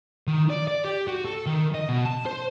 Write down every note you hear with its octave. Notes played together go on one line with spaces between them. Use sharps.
D#3
D5
D5
G4
F#4
A4
D#3
D#5
B2
A5
C5